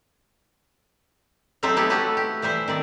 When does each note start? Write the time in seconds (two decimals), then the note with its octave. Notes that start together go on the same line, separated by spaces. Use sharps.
1.63 F#3 C4 D#4 A4 C5 E5
1.76 A3 B3 E4 G4 A4
1.90 F#4 G4 A4 B4
2.17 G4
2.42 E3 G3 C5 E5
2.68 D#3 C4 D5